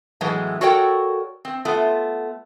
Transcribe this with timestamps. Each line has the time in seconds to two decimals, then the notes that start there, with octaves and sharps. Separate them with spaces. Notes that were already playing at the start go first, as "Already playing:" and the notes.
0.21 A2 E3 F#3 G#3 B3
0.61 F#4 A4 A#4 C#5 D5 G5
1.45 C4
1.65 A3 B3 F4